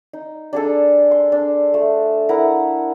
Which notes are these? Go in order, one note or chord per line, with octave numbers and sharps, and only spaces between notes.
D#4
D4 G#4 A4
C6
D4
A3
E4 A#4 F#5